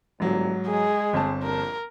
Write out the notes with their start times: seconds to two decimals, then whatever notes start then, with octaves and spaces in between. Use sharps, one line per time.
0.20 G1 G#2 F#3
0.68 G#3 G#4
1.13 G1 C4 A5
1.43 A#1 A#4